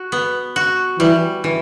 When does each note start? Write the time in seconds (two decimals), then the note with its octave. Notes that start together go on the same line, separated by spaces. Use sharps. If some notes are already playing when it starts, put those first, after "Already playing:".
Already playing: F#4
0.12 B3
0.56 F#4
1.00 E3 G3
1.44 E3